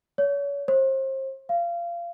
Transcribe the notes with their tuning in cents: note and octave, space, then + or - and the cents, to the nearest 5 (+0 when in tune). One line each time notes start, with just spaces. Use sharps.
C#5 +35
C5 +35
F5 -25